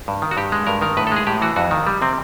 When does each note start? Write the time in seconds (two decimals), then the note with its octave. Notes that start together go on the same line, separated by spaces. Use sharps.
0.08 G2
0.22 D#3
0.31 F#4
0.37 G2 G4
0.52 G#3
0.67 G2 A#4
0.82 D#3 A#4
0.97 A2 B4
1.07 A4
1.12 G#3 G#4
1.27 A2 G4
1.42 E3 F#4
1.56 F2 F#4
1.71 D#3
1.87 G3
2.02 C3 C4